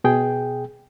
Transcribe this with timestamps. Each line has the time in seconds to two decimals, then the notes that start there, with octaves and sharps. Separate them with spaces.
0.04 B2 G#4 G5